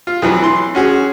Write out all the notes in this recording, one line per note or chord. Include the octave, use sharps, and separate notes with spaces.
F4
F2 E3 F#3
E3 C6
C#4 F#4 G#4